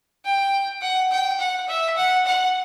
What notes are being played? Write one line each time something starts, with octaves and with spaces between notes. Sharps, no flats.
G5
F#5
G5
F#5
E5
F#5
F#5